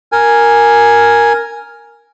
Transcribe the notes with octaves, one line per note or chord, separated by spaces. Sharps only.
A#4 G#5